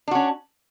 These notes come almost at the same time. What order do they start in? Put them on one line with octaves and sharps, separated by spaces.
D4 F#4 C#4